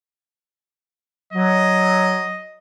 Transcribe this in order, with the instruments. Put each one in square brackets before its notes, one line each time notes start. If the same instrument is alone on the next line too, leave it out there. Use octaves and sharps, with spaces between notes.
[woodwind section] F#3 [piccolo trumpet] D#5